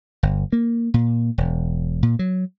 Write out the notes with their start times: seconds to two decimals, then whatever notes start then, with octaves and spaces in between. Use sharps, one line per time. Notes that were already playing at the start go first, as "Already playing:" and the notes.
0.23 G1
0.53 A#3
0.94 A#2
1.38 E1
2.03 A#2
2.19 F#3